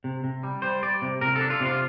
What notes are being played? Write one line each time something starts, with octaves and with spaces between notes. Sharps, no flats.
C3
C3
G3
G3 C5
G3 D5
C3
C3 A#4
A4
D4
F4
C3
F4